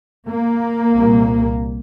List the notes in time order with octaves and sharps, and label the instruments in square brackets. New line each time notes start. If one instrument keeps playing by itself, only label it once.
[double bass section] A#3
C2 A#2